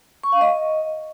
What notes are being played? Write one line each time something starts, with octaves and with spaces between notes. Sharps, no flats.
C#6
F5
D#5